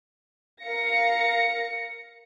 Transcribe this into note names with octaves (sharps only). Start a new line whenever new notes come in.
A#4 F5 A#6 C#7